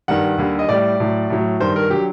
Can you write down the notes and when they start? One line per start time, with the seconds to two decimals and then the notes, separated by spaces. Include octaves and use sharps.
0.08 G2 D#3 G3 F#5
0.38 D#2 D3 G3
0.59 D#5
0.69 A2 G3 D5
1.00 A2 F#3
1.30 A2 F#3
1.60 G2 D#3 G3 C5
1.76 A#4
1.90 D3 F#3 G4